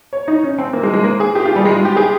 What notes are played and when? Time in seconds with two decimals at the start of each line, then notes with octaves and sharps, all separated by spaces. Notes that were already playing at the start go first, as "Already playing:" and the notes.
0.13 C#5
0.28 D#4
0.44 C#4
0.58 C4
0.73 A#3
0.83 G#3
0.94 G#3
1.04 A#3
1.20 G#4
1.35 G4
1.46 F4
1.56 G3
1.65 G#3
1.76 F4
1.85 G4
1.96 G#4